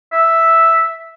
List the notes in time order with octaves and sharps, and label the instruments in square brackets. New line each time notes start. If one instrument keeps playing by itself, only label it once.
[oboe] E5